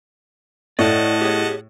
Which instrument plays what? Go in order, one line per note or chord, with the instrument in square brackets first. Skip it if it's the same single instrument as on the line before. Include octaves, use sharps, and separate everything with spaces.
[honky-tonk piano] A2 A3 [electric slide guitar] D5 [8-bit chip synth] D#5 F#5 A5
[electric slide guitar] G4 G#4 C#5